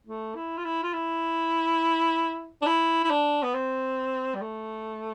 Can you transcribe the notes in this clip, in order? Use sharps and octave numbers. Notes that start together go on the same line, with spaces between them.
A3
E4
F4
E4
F4
E4
D4
E4
E4
D4
B3
C4
G3
A3